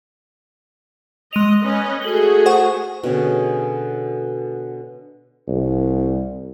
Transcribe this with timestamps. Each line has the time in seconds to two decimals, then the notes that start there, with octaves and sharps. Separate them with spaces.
1.33 G#3 D#5 D#7 F7
1.63 C#4 B4 D#5
2.02 A3 F#4 G#4 F#7 G7
2.46 C5 F#5 C#6
3.03 B2 D3 C#4 G#4
5.48 C2